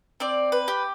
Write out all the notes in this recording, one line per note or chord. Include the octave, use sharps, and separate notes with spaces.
C4 D5
B4
G4